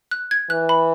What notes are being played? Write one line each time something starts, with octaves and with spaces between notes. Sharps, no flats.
F#6
G#6
E3 F#6
B5